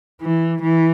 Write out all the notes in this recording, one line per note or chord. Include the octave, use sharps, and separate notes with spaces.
E3
E3